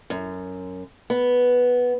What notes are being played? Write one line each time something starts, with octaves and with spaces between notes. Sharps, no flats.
F#2
B3